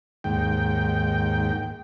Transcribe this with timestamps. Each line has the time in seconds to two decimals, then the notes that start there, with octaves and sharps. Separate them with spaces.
0.24 D#2 G#2 G5